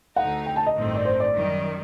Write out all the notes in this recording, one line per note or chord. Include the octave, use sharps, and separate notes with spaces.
D2 D3 A3 D#4 F#5
G5
A5
D#5
A1 G2 D#3 A3 C4
D5
C5
D5
F#2 D#3 G3